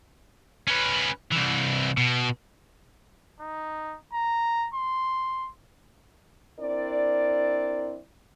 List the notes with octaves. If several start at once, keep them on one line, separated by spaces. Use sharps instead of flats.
C#4 B4
C2 E3
B2
D#4
A#5
C6
C4 D4 E4 A#4 D5